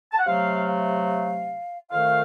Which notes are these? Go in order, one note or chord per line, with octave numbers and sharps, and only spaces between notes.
A5
F#5
C3 F#3 A3 F5
F5
F2 D#3 A3 F5